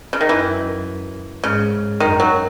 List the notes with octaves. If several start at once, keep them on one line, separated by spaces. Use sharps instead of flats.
C#3
D#3
F#2 E3
G#2 C#3
F#2 D#3
F#3